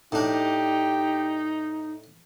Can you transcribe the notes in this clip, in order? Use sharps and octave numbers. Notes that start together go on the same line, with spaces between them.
A2 D4 D#4 G4